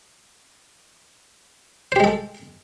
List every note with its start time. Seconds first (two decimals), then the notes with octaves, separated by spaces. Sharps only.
1.92 C5
1.96 G4
2.00 G#3
2.04 A4